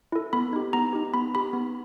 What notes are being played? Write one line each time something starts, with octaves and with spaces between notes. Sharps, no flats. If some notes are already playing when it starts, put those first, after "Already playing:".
E4 A4
B3 B5
D#4 G4
B3 A#5
D#4 G4
B3 B5
D#4 G4 B5
B3